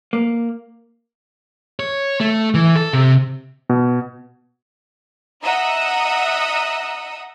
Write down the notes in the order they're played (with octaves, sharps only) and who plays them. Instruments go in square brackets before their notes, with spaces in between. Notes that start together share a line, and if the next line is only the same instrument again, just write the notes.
[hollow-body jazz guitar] A#3
[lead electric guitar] C#5
A3
E3
A4
C3
[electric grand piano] B2
[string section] D#5 E5 F#5 A#5 D#6 E6